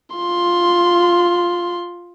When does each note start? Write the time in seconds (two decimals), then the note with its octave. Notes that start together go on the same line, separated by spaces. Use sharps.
0.16 F4 C6